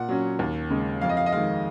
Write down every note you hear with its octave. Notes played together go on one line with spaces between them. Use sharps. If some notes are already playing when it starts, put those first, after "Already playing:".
Already playing: A#2 F#5
F#3 C#4
D#2
C#3 G#3
F2 F5
D#5
F5
D#5
D#3 G#3 F5